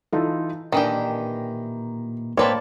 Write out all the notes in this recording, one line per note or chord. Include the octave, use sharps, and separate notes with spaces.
E3 D#4 F4 A4
A#2 D#3 E3 D4 G4 D#5 A#5
A2 A#3 C4 B4 C#5 D5 A5 C6